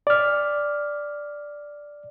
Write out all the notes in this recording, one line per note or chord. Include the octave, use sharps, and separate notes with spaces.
D5 F6